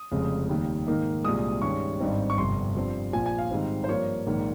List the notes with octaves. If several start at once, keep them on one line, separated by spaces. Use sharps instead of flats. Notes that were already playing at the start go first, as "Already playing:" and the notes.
Already playing: D#6
F1 F2 C#3 G#3
D#2 D#3 G3
G#2 D#3 A#3 D#4
C2 A#2 G#3 D#6
G2 D#3 G#3 C#4 C#6
G#1 G2 G3 C4 D#4
C#6
G1 F2 C3 C6
G2 F3 C4
A#1 A#2 F3 G#5
G#5
F5
G#2 D#3 G3 C4 D#4
C5
G2 F3 A#3 C#5
A#1 G#2 D#3 A#3